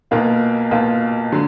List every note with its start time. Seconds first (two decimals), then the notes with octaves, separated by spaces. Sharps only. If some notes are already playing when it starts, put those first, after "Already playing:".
0.11 B1 B2 A#3 F4
0.71 B1 B2 A#3 F4
1.32 D3 F#3